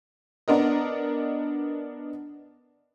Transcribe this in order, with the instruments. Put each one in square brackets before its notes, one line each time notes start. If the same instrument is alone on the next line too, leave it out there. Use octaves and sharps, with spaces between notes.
[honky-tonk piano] B3 D4 A#4 D#5